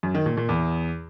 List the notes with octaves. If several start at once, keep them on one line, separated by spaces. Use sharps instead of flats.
F#2
D#3
A#2
A#2
E2